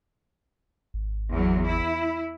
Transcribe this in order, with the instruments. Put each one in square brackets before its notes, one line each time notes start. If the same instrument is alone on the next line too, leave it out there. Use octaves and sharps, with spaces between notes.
[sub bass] G#1
[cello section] E2 F#3
E4